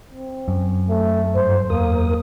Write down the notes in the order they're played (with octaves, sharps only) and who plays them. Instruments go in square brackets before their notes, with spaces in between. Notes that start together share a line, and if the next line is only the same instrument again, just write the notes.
[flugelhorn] C4
[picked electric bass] F#2
[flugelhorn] A3
[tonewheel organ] G2 [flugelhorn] C5
[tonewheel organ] E2 A#4 D#6 [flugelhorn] A#3